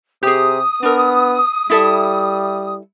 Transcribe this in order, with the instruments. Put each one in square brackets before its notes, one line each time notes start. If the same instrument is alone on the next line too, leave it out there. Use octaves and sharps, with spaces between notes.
[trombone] C3 [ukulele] G4 G#4 [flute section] D#6
[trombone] B3 [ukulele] D4 A#4
[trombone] G3 [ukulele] E4 A4 E5